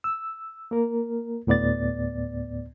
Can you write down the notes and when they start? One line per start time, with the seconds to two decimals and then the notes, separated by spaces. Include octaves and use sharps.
0.04 E6
0.71 A#3 A#4
1.47 D2 A2 B3 D5 A6